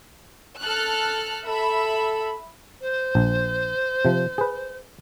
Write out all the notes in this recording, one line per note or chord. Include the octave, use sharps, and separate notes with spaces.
A4 F6 F#6
A4 E5 B5
C5
A#1
C3 F3
G#4 B4